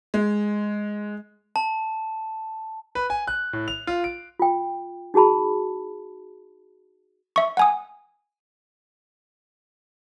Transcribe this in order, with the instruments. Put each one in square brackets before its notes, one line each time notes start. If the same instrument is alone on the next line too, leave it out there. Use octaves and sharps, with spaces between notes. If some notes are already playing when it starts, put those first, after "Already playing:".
[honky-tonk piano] G#3
[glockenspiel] A5
[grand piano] B4
G#5
F#6
A2
F7
F4
D7
[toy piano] F4 G5
D#4 F#4 G#4 A5 B5
[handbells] E5 C#6
F#5 G#5 D#6